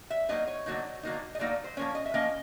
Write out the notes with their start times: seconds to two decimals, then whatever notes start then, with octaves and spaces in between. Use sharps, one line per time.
0.10 E5
0.29 D3 F#3 A#3 D#4 D#5
0.47 C#5
0.66 D3 F#3 A#3 D#4
1.03 D3 F#3 A#3 D#4
1.35 D#5
1.39 D3 F#3 A#3 D#4 D5
1.64 C5
1.77 F3 A#3 C#4 C#5
1.95 D#5
2.05 E5
2.14 F3 A#3 C#4 D#5